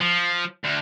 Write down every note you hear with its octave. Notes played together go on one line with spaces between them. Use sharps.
F3
D2